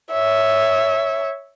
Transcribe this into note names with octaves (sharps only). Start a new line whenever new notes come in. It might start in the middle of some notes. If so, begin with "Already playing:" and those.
C#5 E5